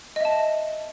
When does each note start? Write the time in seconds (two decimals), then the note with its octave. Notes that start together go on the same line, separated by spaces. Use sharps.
0.16 D#5
0.21 E5
0.25 A5